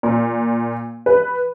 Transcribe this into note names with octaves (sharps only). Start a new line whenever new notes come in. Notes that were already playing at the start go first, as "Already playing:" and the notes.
A#2
B4